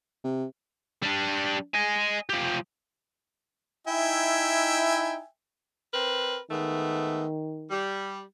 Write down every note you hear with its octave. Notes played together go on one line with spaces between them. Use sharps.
C3
G3 D4
D#5 G#5
F3 G4
D#4 E4 E5 G5 G#5
C4 A#4 B4
D#3 G#3 A3 B3
G3